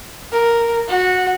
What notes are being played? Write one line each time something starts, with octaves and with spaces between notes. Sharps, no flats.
A#4
F#4